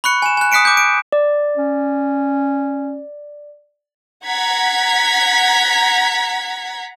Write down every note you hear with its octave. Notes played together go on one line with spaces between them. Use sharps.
B5 C#6 F#6 C#7
G#5 E7
G#5 F#6
D#6 F#6 B6 C#7 D7
D6 G6
D7
D5
C#4
F#5 A#5 G#6 B6